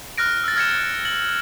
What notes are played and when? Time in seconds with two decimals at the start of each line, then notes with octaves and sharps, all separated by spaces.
0.18 F6 F#6 A#6 D7
0.44 E6 A6
0.56 F6 G#6 A#6 C#7 E7
1.05 A6 F#7